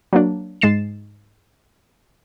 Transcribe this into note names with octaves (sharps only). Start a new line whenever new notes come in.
F#3 A#3 D4
G#2 G#3 A6 C7 E7